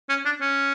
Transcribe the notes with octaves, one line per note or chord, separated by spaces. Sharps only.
C#4
D4
C#4